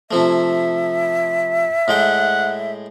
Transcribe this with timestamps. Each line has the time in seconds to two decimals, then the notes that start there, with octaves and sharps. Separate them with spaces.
0.11 C3 F3 A3 E5
1.88 A2 G#3 F#5 G5